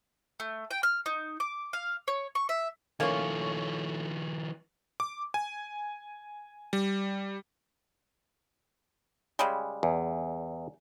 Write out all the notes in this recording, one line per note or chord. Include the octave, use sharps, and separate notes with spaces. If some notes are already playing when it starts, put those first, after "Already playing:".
A3
G5
F6
D#4
D6
F5
C#5
C#6
E5
D#3 F3 A3 A#3 C#4 C#5 F5
D6
G#5
G3
C#3 G3 G#3
E2